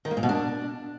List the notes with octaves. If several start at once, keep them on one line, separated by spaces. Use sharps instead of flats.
D#3
A#3
A#2
B2
D4